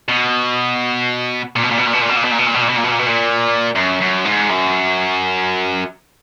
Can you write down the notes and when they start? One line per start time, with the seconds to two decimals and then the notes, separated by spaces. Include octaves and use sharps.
0.09 B2
1.56 A#2
1.63 B2
1.70 A#2
1.78 B2
1.86 A#2
1.93 B2
2.01 A#2
2.09 B2
2.16 A#2
2.24 B2
2.31 A#2
2.38 B2
2.46 A#2
2.54 B2
2.61 A#2
2.69 B2
2.77 A#2
2.84 B2
2.92 A#2
2.99 B2
3.06 A#2
3.76 F#2
4.01 F#2
4.25 G#2
4.50 F#2